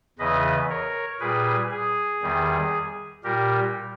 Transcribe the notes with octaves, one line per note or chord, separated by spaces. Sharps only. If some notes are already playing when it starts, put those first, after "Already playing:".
E2 C#3 E3 B4 D#5
A#4 C#5
A#2 G3 G#4 B4
G#4
E2 D#3 G3
A#2 G3 G4 A#4